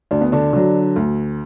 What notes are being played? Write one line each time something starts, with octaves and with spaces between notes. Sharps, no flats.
D2 D4
B3
D3 D4
D3 F#3
D2